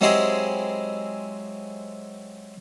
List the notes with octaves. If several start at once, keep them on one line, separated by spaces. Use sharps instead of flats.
F#3 G#3 C4 E4 G4 G#4